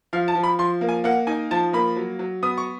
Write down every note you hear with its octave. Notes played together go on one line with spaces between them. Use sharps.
F3 F5
A5
F3
B5
F3 C6
A#3
G#5
A#3 F#5
D#4 G#5
F3 A5
A#3 B5
F#3
F#3
B3 D#6
C#6